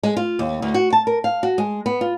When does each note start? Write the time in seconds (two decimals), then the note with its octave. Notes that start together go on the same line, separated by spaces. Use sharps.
0.03 G#3
0.17 F4
0.39 D#2
0.62 D2
0.74 F#4
0.93 A5
1.07 A#4
1.24 F5
1.43 F#4
1.58 G#3
1.86 B3
2.01 F4